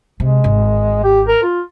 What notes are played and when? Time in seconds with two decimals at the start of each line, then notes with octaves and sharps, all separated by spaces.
0.20 C3 G#3
0.44 G#1
1.04 G4
1.28 A#4
1.43 F4